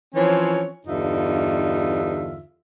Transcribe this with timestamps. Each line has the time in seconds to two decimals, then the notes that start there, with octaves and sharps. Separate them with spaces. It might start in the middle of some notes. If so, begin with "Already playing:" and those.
0.15 E3 F3 C4 C#4 C#5
0.87 E2 G2 D3 D#4 F4 E5